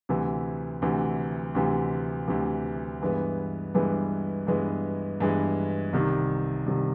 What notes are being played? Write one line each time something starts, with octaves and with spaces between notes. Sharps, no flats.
D2 C3 E3
D2 C3 E3
D2 C3 E3
D2 C3 E3
G2 E3 G#3 B3
G2 E3 G#3 B3
G2 E3 G#3 B3
G2 E3 G#3 B3
C2 C3 D#3
C2 C3 D#3